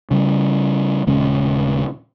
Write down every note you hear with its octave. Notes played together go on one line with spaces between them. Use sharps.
C#3 G3
D#1 C#3 G#3 C#4